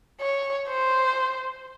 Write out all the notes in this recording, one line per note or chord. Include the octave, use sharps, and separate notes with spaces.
C#5
C5